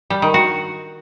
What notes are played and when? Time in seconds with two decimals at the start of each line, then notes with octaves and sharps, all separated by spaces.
0.10 G3
0.22 D#3
0.34 F#4